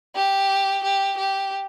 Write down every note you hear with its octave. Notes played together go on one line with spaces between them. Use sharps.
G4
G4
G4